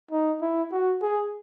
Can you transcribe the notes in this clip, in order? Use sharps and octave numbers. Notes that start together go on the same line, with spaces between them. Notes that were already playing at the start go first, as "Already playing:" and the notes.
D#4
E4
F#4
G#4